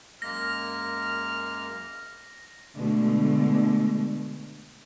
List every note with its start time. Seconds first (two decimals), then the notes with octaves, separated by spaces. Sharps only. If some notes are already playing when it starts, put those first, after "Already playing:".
0.22 F#2 G#3 A#3 F6 A#6
2.76 B2 D3 G#3 A3